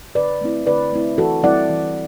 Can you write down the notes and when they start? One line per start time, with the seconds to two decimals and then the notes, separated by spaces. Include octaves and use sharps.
0.15 D3 B4 D5
0.41 A3 C4 E4
0.66 D3 B4 D5
0.92 A3 C4 E4
1.18 E3 F#4 A4
1.43 G3 C4 E4 D5 F#5
1.69 E3